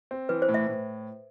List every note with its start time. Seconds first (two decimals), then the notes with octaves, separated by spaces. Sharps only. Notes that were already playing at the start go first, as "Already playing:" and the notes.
0.11 C4
0.29 E3 B4
0.42 C5
0.48 A2
0.54 E5
0.67 A2